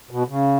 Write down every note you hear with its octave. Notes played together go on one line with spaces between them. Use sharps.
B2
C#3